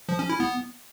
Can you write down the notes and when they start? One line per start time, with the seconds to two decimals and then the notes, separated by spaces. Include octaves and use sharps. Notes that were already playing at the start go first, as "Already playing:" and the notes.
0.09 F3
0.19 C#4
0.29 E4
0.40 B3